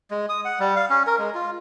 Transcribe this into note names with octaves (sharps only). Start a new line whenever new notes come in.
G#3
D#6
F#5
G3
F5
C#4
A#4
G#3
F4